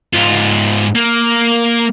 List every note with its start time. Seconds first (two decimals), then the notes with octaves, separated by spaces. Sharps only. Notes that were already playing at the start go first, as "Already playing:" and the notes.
0.14 G#2 F4
0.95 A#3